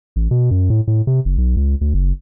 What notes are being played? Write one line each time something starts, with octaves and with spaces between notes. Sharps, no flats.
A1
B2
F#2
A2
A2
C3
F#1
B1
C#2
D2
F#1